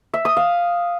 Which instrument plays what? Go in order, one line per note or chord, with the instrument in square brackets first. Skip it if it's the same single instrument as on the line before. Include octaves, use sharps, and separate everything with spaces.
[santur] E5
D#6
F5